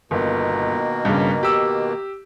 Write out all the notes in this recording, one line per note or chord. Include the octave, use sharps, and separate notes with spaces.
G1 B2 D#3 A#3
G2 C#3
G4 E6